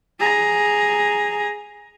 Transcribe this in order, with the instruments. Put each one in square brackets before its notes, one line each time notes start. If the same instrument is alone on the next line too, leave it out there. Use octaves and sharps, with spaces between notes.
[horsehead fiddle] G#4 A#5